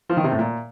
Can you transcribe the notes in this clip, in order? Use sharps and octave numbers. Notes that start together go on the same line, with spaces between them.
F3
D#3
C3
A2
A#2